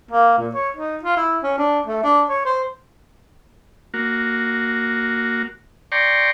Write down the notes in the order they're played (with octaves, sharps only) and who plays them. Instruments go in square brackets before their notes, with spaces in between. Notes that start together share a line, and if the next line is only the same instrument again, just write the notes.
[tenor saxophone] A#3
A#2
C#5
D#4
F4
E4
C#4
D4
A3
D4
C#5
C5
[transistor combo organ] A#3 F#4
D5 G5 A#5 C6 C#6